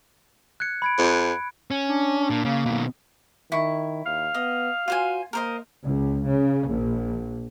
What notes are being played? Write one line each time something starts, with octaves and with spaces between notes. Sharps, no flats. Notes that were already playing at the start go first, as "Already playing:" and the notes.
F#6 G#6 C#7
B5 G#6 D7
F2
C#4
D4
A#2
C#3 A#3
B2 D#3
D#3 E4 C#6
D#2 F5
B3 D#5
F4 F#4 C5 G#5
A#3 A#4 C5 D#5
C#2
C#3
A#1